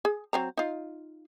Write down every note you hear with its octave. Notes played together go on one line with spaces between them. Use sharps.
G#4
F#3 C4 A#5
D#4 F4